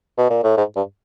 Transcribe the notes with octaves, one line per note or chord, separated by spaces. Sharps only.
B2
A#2
A2
G#2
G2